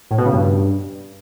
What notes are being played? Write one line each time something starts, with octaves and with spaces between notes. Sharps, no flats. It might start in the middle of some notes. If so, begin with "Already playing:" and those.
A2
B2
C#3
G2